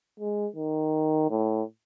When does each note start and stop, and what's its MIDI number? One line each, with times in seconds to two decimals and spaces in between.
0.20 0.47 56
0.56 1.27 51
1.30 1.63 45